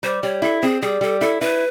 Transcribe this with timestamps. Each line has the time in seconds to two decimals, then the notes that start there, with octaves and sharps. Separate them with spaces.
0.03 G3 C5
0.23 G3 C#5
0.42 E4 A4
0.62 C4 G#4
0.82 G3 G#4
1.01 G3 A4
1.21 E4 A4
1.41 E4 B4